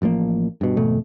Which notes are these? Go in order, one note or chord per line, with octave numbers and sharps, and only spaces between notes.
A1 F3 G3 A#3
G2 B2
G#1 F2 B2 A3